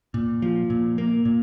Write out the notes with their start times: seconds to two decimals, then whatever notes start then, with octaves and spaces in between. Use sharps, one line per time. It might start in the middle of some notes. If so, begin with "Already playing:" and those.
0.14 A#2
0.42 F3
0.70 A#2
0.98 A#3
1.25 A#2